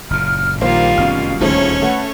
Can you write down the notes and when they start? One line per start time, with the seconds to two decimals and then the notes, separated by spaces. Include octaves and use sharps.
0.10 F#1 A#2 F6
0.61 A#1 D#3 G3 A#3 F4 C5 F5
0.98 F1 F#2 B2 C#4 F6
1.41 D#1 D2 G#2 F3 A3 C#4 C#5
1.82 A3 B4 F#5